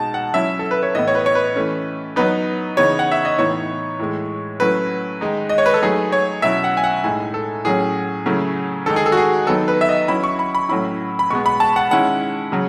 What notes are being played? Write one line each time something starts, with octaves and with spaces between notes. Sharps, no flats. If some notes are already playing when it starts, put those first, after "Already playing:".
Already playing: B2 G#3 D#4 A5
F#5
F#3 C#4 E4 E5
A4
B4
C#5
A2 E3 B3 D#5
C#5
B4
C#5
B4
E3 A3 C#4
F#3 B3 D#4 B4
C#3 E3 B3 D#4 C#5
F#5
E5
D#5
A2 E3 B3 D#4 C#5
A2 E3 G#3
F#3 A3 C#4 E4 B4
D#3 G#3 D#4
D#5
C#5
B4
A4
F#3 A3 D#4 G#4
C#5
B2 F#3 C#4 E4 E5
F#5
G#5
F#5
A2 G#3 D#4 G#5
A4
A2 F#3 C#4 G#4
C#3 F#3 A3 C#4 E4
D#3 G#3 D#4 A4
G#4
A4
F#4
G#4
D#3 F#3 B3 D#4 A4
B4
E5
D#5
F#3 C#4 E4 B5
C#6
B5
B5
A2 F#3 A3 C#4 E4 B5
B5
B2 G#3 B3 C#6
B5
A5
F#5
D#3 G#3 C#4 E4 F#5
C#3 F#3 C#4